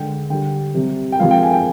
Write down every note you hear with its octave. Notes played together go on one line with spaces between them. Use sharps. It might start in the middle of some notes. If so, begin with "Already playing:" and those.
Already playing: D3 G#3 G5
D3 G3 G5
C3 G3
G5
C3 F3 G#3 F5
G5
G#5
G5